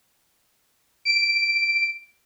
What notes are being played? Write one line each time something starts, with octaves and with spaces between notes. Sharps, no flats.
D7